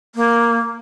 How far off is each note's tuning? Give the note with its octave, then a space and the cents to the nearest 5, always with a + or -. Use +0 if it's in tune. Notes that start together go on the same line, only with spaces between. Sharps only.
A#3 +0